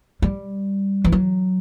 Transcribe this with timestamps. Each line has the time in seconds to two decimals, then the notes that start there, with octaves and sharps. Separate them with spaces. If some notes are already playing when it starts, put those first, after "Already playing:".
0.22 G3
1.04 E3
1.12 F#3